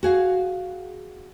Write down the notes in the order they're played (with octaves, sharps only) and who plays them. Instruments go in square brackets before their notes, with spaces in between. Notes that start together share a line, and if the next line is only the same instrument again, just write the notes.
[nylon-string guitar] F#4 G#4 F5